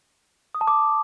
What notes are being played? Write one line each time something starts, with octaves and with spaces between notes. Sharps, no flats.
D#6
A5
D6